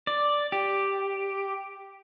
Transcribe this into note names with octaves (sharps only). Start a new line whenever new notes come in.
D5
G4